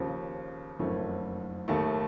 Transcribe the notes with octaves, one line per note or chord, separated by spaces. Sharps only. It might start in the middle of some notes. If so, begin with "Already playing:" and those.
Already playing: D#2 C#3 F3
F#1 F2 D#3 A3 C#4
D#2 D#3 A3